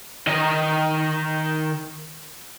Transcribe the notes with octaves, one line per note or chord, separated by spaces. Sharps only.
D#3 D#5